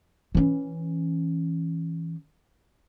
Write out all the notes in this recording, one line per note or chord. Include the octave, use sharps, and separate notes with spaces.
E3 C#4